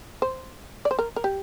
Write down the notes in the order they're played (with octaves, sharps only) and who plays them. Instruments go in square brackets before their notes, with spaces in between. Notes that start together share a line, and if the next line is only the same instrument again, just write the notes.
[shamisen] C5
D5
C5
A#4
A#4
G4